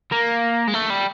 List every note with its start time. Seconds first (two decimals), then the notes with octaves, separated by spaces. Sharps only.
0.12 A#3
0.67 G#3
0.74 A3
0.90 G3